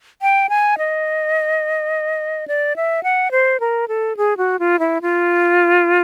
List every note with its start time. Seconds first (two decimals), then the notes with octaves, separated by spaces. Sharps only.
0.22 G5
0.49 G#5
0.78 D#5
2.48 D5
2.76 E5
3.03 F#5
3.31 C5
3.60 A#4
3.88 A4
4.17 G#4
4.37 F#4
4.59 F4
4.79 E4
5.02 F4